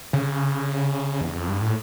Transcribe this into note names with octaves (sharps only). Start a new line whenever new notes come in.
C#3
E2
F2
G2
A2